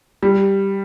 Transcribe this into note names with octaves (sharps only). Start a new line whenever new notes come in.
G3